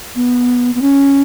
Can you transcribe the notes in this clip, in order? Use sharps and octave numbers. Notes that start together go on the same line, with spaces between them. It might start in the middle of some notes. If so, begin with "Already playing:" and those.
B3
B3
C#4